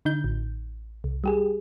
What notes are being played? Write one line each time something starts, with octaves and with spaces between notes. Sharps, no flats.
D3 D#4 G6
A1
C2
G3 G4 G#4